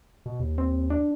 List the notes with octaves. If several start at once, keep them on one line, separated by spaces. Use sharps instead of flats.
B2
D#2
C4
D4